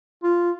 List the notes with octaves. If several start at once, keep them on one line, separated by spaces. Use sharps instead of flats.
F4